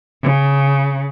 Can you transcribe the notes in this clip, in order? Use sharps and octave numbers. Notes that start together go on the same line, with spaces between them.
C#3